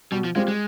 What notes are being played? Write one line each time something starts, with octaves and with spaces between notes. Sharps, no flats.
B2 G3
F3
G3 G#3 C4 F4
G#3